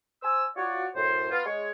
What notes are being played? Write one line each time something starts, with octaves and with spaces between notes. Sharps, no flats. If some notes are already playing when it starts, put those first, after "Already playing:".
C5 G#5 E6
F4 F#4 C#5 D5
F#2 A2 C5
B3 F4
G#3 C#5